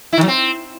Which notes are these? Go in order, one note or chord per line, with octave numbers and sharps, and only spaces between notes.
E4
D#3
F#3
C4